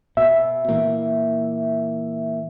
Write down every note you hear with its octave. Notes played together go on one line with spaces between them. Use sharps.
B2 E5
A#2 E3 A#3